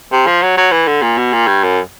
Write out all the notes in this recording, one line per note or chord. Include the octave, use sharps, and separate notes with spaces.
C3
F3
F#3
F#3
E3
D3
A#2
B2
A#2
G2
F#2